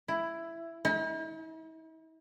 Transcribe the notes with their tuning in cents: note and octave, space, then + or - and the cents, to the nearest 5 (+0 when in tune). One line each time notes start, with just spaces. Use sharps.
E4 +10
E4 -45